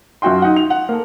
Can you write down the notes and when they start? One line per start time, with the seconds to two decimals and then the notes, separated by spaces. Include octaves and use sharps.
0.22 F#2 F4 F#4 G5 C6
0.42 D#4 F#5
0.56 F7
0.70 F#5
0.89 A#3 A4